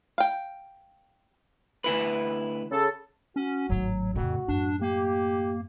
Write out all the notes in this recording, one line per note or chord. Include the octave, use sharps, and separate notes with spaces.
F5 G5
D2 E4 B4
C#3 A4
C#4 F#4
G#1 A2 F#3
F2 A2 C#3 F#4
F#2 A2 D4
A#3 G4